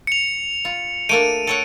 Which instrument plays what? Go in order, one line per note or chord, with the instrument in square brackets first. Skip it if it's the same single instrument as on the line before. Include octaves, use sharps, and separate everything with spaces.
[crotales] C#7 F7
[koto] F4
[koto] A3 A#3 D4 [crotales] D7 D#7
[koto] A4 C#5 F#5